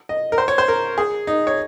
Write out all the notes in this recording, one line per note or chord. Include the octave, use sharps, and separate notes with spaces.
D#5
A#4
C5
C#5
C5
A#4
G#4
D#4
C#5